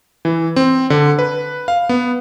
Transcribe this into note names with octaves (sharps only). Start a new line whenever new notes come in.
E3
C4
D3
B4
F5
B3